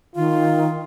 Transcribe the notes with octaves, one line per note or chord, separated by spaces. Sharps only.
D#3 F4